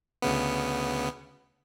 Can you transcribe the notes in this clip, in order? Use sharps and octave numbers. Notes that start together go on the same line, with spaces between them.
D2 C#3 B3